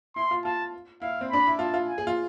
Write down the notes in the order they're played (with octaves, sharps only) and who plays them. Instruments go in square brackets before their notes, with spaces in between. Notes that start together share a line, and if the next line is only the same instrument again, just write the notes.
[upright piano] E4 [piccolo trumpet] C6
[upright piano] F4
[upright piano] F4 [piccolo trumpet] A5
[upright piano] E4 [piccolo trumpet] F5
[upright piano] C4
[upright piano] D4 [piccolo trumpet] B5
[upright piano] E4
[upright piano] F4 [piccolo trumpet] A5
[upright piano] F4
[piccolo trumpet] G#5
[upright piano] G#4
F4